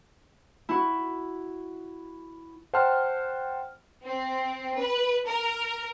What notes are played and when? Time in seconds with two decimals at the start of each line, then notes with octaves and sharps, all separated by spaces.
0.69 E4 F#4
2.73 C5 F#5 G5 A5 C6 F6
4.05 C4
4.79 B4
5.27 A#4